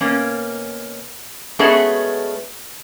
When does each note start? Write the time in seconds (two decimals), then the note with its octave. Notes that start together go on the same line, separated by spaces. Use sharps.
0.01 B2 A#3 C#4
1.59 G#3 A3 B3 C#4 F#4 G#4